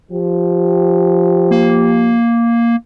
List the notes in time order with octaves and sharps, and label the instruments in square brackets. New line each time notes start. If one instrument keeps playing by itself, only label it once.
[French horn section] F3 G4
[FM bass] A#3